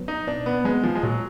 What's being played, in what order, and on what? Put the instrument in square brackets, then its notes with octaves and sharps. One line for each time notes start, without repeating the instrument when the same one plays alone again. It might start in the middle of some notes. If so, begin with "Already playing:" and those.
Already playing: [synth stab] F#3 B3
[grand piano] D#4
[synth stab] B2 [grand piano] D4
[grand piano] B3
[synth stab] F#3 B3 [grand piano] G#3
[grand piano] F3
G#3
[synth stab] A#2 [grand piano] F#3